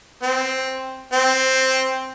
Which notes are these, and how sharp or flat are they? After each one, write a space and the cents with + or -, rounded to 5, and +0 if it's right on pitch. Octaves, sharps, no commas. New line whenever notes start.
C4 +5
C4 +5